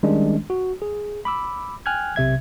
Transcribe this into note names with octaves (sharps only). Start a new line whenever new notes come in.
D#3 G3 G#3 C#4 D4
F#4
G#4
B5 D6 E6
G5 G#5 F6 F#6 G#6
B1 C3 E5 G#6